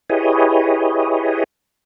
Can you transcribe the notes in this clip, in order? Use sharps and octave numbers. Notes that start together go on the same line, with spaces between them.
E4 G4 G#4 B4 C#5 D#5